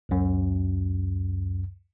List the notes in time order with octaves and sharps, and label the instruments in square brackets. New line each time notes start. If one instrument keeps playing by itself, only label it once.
[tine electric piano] C#2 F#2